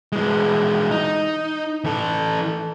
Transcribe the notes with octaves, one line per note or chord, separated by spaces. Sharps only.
E3 G#3
D#4
E3 A4